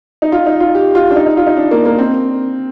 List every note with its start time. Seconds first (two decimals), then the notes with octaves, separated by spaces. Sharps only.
0.22 D#4
0.32 F4
0.46 D#4
0.60 F4
0.75 G4
0.95 F4
1.10 D4
1.16 D#4
1.26 D#4
1.37 F4
1.47 D#4
1.57 D4
1.71 A#3
1.85 A#3
1.98 C4